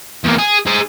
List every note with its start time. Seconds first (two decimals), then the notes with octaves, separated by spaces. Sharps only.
0.24 E2 A#3
0.38 G#4
0.67 G#4 C5